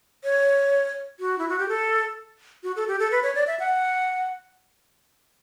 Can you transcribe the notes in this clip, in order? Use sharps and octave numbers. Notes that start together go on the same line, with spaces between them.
C#5
F#4
E4
F#4
G4
A4
F#4
A4
G4
A4
B4
C#5
D5
E5
F#5